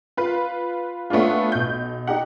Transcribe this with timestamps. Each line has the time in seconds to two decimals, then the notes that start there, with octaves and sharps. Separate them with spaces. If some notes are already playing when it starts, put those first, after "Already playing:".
0.17 F4 B4
1.10 A3 B3 C#4 D4 F4
1.52 B1 G6
2.07 D#4 G4 F#5